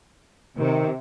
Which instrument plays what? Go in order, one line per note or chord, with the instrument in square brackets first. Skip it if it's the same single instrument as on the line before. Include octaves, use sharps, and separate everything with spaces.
[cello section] C3 [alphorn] D#3